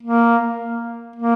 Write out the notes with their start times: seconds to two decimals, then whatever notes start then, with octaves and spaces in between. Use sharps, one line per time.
0.03 A#3
1.16 A#3